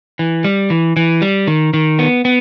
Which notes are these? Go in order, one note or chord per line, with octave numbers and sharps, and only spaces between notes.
E3
G3
E3
E3
G3
D#3
D#3
B3
B3